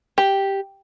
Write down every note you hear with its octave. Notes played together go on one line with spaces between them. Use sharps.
G4